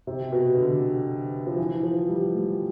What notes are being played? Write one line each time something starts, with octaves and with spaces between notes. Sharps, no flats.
C3
B2
D3
F3
E3
F3
G3
A3